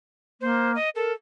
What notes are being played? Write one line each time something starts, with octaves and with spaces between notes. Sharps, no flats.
A#3 C5
D#5
A4 A#4